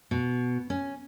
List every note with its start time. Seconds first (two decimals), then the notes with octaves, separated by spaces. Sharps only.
0.11 B2
0.70 C#4